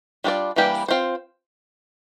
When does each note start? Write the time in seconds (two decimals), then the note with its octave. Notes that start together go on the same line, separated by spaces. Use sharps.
0.24 G3 D4 F4 A4 D5
0.56 E3 G3 A#3 D4 G4
0.88 C4 F4 C5